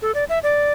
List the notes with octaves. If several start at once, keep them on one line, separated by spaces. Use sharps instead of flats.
A4
D5
E5
D5